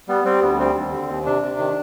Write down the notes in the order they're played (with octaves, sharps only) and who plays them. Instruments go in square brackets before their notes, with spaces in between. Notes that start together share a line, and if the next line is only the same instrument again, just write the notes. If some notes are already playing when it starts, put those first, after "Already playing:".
[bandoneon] G3 B3
G3 C4
D2 B3
G3 C4
D#2
D3
D#2
C3 D4
C3
D#3